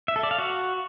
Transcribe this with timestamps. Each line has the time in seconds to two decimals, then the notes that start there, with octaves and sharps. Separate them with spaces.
0.08 E5
0.16 A4
0.23 D5
0.31 F5
0.38 F#4